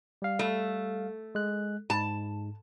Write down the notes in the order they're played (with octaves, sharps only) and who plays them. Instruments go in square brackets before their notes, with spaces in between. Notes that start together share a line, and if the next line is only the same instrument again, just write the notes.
[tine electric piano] G3 F5
[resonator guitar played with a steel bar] A3
[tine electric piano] G#3 F#6
[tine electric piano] G#2 [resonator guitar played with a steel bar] A5